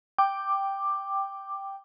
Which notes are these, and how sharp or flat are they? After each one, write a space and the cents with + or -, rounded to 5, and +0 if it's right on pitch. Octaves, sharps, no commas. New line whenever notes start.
G5 +0 D6 +10